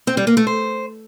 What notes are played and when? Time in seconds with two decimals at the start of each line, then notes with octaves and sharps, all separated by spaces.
0.07 C4
0.17 G3
0.27 A#3
0.37 A3
0.47 C5